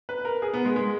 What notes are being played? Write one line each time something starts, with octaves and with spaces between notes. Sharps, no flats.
B4
A#4
G#4
B3
G#3
G#3